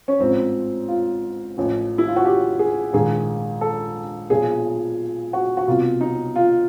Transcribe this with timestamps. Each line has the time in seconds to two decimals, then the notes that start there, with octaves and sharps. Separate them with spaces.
0.08 C#4
0.19 A1 G#2 F3 C4
0.88 F4
1.57 A1 A2 F3
1.98 E4
2.08 F4
2.16 F#4
2.25 G4
2.59 G#4
2.93 A#1 G#2 D#3 G#4
3.61 A4
4.30 B1 A#2 F3 G#4
5.33 F#4
5.57 F#4
5.67 C2 B2 F4
6.01 D#4
6.36 F4